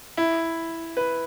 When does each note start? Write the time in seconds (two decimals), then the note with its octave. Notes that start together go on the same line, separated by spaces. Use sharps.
0.17 E4
0.97 B4